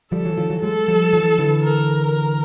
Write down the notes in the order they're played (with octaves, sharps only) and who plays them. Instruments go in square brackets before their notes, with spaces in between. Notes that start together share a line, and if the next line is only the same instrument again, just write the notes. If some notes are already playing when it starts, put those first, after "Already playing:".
[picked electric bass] F3 G3 [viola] A4
[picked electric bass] E3 F#3
D#3 F3
E3 F#3
[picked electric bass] F#3 G#3 [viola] A4
[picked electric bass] F3 G3
E3 F#3
D3 E3
[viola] A#4
A#4